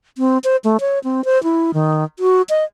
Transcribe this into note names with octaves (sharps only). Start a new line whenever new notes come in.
C4
C5
A3
C#5
C4
C5
E4
D#3
F#4
D#5